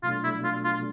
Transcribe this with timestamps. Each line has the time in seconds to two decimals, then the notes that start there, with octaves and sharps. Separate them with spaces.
0.03 B2 F#3 A3 D4 F4
0.24 E4
0.44 F4
0.64 F4